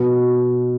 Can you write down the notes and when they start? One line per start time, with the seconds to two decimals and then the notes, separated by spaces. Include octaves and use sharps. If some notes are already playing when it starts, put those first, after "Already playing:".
Already playing: B2